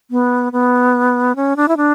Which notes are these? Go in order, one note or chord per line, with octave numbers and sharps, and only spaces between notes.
B3
B3
C#4
D4
E4
D4